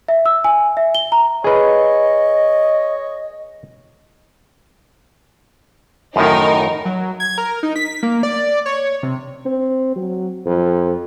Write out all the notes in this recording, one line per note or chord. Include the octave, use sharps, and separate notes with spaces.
E5
E6
G#5
E5
G7
A#5
G#4 B4 C#5 D#5
F#2 A2 D#3 D#4 A#4
F#3
G#6
A#4
D#4
B6
A#3
D5
C#5
C3
C4
F#3
F2